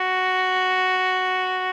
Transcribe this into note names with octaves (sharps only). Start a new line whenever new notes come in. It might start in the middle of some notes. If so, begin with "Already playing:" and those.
Already playing: F#4